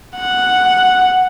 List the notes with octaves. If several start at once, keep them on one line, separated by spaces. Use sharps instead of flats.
F#5